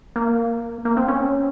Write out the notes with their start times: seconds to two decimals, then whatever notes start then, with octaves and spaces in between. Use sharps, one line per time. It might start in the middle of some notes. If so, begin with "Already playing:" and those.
0.16 A#3
0.85 A#3
0.97 C4
1.08 C#4